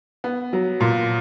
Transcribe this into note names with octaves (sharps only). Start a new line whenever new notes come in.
B3
F#3
A#2